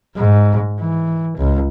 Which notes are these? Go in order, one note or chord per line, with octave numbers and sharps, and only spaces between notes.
G#2
E3
C#2